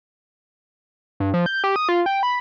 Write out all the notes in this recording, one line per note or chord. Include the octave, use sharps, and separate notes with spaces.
G2
F3
G6
G4
D#6
F4
G5
B5